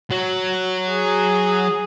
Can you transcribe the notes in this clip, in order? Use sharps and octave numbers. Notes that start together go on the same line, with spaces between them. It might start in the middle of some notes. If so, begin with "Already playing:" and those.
F#3
G#4